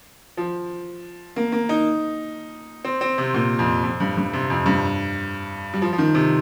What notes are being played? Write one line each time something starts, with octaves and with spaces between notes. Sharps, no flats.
F3
A#3
A#3
D#4
C4
C4
C3
A#2
F2
F2
G2
G2
C3
F2
G2
G3
F3
F3
D#3
C3